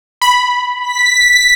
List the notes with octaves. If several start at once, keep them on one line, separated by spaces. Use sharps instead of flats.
B5
B6